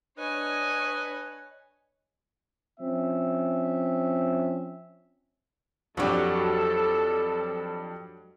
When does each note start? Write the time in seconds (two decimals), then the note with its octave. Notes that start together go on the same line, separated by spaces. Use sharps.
0.18 D4 B4 C#5 D#5 G#5
2.80 F3 C4 C#4 E5
5.97 F2 F#3 D4 F#4 G4 A4